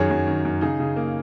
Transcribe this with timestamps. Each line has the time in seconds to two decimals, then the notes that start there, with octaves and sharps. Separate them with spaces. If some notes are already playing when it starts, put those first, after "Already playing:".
Already playing: F#2 D#3 G#4 C#5
0.11 F#2
0.27 D#3
0.45 F#2
0.61 C#3 D#4 G#4
0.80 C#3
0.96 A#3